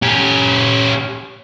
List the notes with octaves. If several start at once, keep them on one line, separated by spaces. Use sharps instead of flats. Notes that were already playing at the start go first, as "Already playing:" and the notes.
C#4 G4